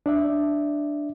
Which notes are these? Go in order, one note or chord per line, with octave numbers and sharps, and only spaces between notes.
D4 D5 E5